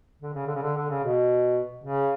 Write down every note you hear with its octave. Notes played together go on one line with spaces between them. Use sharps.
D3
C#3
D3
C#3
D3
D3
C#3
B2
C#3